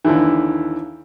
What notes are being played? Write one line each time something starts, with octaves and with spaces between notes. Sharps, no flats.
D#2 D3 E3